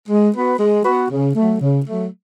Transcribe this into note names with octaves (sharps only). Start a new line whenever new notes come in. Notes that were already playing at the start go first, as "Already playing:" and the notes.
G#3
B3 F#4 B4
G#3
B3 F#4 B4
C#3
F#3 A3
C#3
F#3 A3